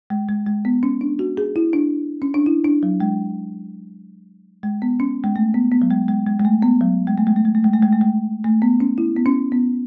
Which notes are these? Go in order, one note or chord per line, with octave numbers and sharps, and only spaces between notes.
G#3
G#3
G#3
B3
C#4
D4
F#4
G#4
E4
D4
C#4
D4
E4
D4
F#3
G#3
G#3
B3
C#4
G#3
A3
B3
B3
F#3
G#3
G#3
G#3
G#3
A3
B3
F#3
G#3
A3
G#3
A3
G#3
A3
G#3
A3
G#3
A3
G#3
A3
B3
C#4
E4
B3
C#4
B3